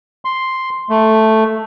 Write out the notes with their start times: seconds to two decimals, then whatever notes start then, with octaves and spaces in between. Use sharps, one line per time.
0.25 C6
0.89 A3